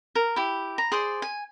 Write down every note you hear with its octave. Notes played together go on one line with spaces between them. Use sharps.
A#4
E4 G4
A#5
G#4 C5 D5
G#5